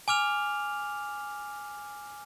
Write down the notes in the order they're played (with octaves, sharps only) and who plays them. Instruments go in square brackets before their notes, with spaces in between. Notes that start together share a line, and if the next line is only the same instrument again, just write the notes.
[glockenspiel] G#5 D6 F6 F7